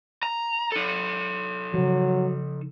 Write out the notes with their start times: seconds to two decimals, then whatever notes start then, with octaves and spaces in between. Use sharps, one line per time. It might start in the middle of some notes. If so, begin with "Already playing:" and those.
0.23 A#5
0.72 D#4 A4
1.74 C#3 F3 F#3